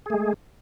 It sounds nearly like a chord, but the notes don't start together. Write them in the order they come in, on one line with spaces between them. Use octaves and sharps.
G#4 A3 G#3